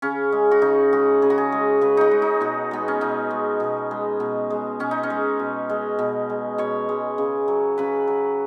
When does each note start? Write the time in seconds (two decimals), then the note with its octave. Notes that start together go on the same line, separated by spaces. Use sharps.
0.02 C#3 C#4
0.32 G#3
0.51 F#4
0.62 C#3 D#4
0.93 G#3 F#4
1.22 C#3 G#4
1.30 F#4
1.38 G#4
1.52 G#3
1.81 C#3 B4
1.97 D#4 F#4
2.11 G#3
2.22 D#4
2.41 B2 F#4
2.71 G#3 B3
2.88 C#4
3.01 B2 D#4
3.31 G#3
3.60 B2
3.91 G#3
4.20 B2
4.50 G#3
4.80 B2 C#4
4.91 D#4
5.03 C#4
5.10 G#3
5.39 B2
5.69 G#3
5.99 B2
6.30 G#3
6.58 B2 C#5
6.89 G#3
7.18 C#3
7.48 F#3
7.78 C#3 B4
8.07 F#3